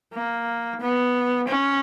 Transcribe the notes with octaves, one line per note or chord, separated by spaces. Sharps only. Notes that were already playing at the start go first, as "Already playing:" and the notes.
A#3
B3
C#4